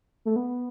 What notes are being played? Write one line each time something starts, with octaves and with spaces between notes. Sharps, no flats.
A3
B3